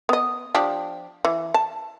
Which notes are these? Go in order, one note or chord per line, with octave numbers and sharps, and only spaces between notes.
B3 D#5
F3 D4 G4
E3
A5